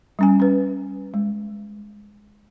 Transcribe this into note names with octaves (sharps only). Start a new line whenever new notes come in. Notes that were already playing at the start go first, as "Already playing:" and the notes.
G3 C#4 G#5
C#4 B4
G#3